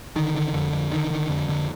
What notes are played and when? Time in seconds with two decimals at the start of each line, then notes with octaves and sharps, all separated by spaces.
0.16 D3 D#3
0.35 D3
0.53 F2 D3
0.72 F2
0.92 D3 D#3
1.10 D3 D#3
1.29 F2 D3
1.48 F2 D3